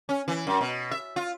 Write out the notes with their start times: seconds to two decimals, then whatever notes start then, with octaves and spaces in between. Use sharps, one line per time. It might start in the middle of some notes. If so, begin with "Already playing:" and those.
0.09 C#4
0.28 E3
0.47 F#2
0.61 B2
0.91 E5
1.16 F4